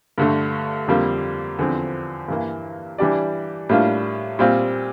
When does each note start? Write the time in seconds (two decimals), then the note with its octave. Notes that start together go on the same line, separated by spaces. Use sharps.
0.18 G2 D3 A3
0.88 F2 D3 G3 A#3
1.59 E2 D3 F3 C4
2.28 G2 E3 A#3
2.98 E3 G3 D4 G4 D5
3.69 A2 G3 A#3 D4 F4
4.39 A#2 G3 C4 F4